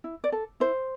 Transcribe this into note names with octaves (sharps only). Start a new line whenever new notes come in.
E4
D5
A4
E4 C5